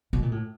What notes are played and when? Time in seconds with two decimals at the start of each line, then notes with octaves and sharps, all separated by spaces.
0.13 B2
0.23 A#2
0.32 A2